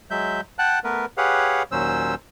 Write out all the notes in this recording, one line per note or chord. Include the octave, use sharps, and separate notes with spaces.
F#3 G#3 E5 G6
F#5 G5 A5 F#6
A3 B3 A#4 B4
G4 G#4 B4 C#5 F5 F#5
D#2 A#2 F#3 C#4 C5 E6